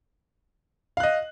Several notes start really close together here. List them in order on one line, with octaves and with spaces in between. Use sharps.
F5 F#6 D#5